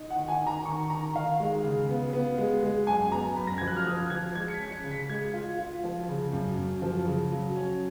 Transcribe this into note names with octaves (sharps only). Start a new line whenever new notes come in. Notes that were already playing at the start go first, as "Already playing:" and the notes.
Already playing: D#4
F#5
D#3
G#5
D#3
A#5
D#3 C#6
D#3 A#5
D#3 F5
G#3
C#3
B3
B3
G#3
G#3
F#2 G#5
B3 A#5
F#2 B5
A#6
F3 G#6
F#6
F6
F3 D#6
F3 G#6
G#3 G#6
C#7
B6
C#4
C#7
C#3
B6
G#3 G#6
F4
F4
F3
C#3
F#2
F#2
F3
C#3
F#3
C#4